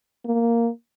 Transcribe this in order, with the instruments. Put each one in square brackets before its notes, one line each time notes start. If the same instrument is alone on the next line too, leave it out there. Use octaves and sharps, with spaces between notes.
[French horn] A#3